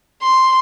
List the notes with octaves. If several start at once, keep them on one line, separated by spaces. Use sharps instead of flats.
C6